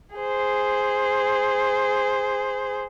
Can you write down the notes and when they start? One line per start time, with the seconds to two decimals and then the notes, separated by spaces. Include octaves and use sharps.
0.16 G#4 C5